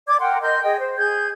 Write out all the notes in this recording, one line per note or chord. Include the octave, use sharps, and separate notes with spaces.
D5 D6 G#6
A#4 F#5 G5 C6
A#4 D#5 C6 G6
G#4 D#5 G5
C5
G#4 G6 G#6